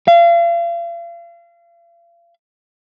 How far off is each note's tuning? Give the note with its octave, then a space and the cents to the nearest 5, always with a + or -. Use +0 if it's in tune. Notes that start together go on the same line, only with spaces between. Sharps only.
F5 -40